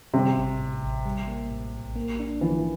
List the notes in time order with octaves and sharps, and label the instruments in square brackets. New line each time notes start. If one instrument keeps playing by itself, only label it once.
[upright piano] C3 [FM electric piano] G3
[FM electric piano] A1
A2
A1
G3
A#3
A2
A#1
A#3
D4
[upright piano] E3 [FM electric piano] F3